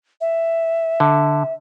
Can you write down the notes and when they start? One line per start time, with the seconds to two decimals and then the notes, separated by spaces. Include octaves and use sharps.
0.21 E5
1.00 D3